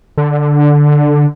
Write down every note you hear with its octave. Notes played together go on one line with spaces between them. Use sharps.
D3